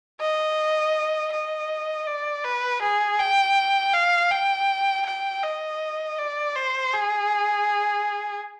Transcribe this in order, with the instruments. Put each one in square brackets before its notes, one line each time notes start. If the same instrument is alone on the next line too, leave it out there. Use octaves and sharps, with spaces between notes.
[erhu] D#5
D#5
D5
B4
G#4
G5
F5
G5
G5
D#5
D5
C5
G#4